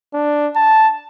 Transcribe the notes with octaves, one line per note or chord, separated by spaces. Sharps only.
D4
A5